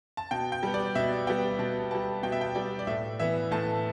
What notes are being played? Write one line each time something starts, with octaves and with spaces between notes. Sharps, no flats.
A5
B2 G5
G5
G3 B3
D5
B2 E5
G3 B3 G5
B2 A5
G3 B3 A5
B2 G5
E5
G5
G3 B3 D5
D5
A2 E5
E3 B3 E5
A2 A5